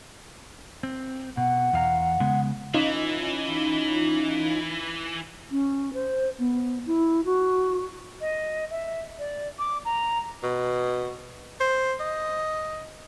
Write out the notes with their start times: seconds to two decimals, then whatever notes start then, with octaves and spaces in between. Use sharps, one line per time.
0.83 C4
1.37 B2 F#5
1.73 E2 F5 A#5
2.20 C#3 G#3 B3
2.74 E3 C#4 D#4 F4
5.51 C#4
5.93 C5
6.39 B3
6.86 E4
7.25 F#4
8.21 D#5
8.71 E5
9.19 D5
9.59 D6
9.85 A#5
10.43 B2
11.60 C5
12.00 D#5